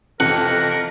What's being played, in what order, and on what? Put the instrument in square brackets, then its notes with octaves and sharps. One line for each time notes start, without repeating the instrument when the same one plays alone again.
[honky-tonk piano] F2 [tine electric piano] C3 E3 A4 [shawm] A#4 [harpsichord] F#5